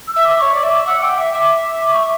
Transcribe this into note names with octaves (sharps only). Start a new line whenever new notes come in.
E6
E5
D6
C#5 C#6
D5 D6
E5
D6
F#5 E6
G5 D6
E5
E5 D6
D6
C#6